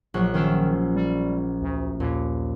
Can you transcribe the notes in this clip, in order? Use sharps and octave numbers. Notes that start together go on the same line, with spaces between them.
A#1 F#3 F#6
D#3 C#4 F4 E5
G3
D2
D#2 A#2